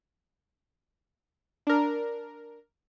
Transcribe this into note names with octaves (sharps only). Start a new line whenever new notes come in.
D4 A#4